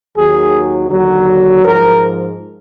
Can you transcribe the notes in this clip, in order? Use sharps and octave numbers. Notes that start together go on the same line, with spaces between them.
D#2 D#3 F#3 G#4
D#2 D3 F#3
G#2 F3 A#4